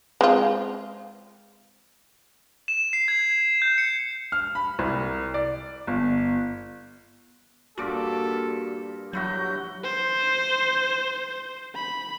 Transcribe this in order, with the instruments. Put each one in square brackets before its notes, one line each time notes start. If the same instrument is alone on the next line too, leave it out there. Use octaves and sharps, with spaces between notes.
[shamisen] G#3 C4 F4
[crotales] E7
C7
G#6
G6
C#7
[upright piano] F6
B5
C2
D5
G1
[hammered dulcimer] G2 A#2 D6 [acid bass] F#4 [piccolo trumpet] A4
[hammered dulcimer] G2 E4 F#4 [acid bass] F#3 [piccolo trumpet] G6
[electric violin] C5
B5